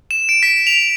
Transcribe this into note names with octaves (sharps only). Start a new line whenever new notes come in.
E7
D7
B6
F7